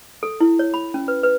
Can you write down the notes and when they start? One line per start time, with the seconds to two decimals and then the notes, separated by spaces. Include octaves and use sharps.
0.23 A4
0.40 E4
0.59 C#5
0.74 B5
0.94 C#4
1.08 B4
1.23 B4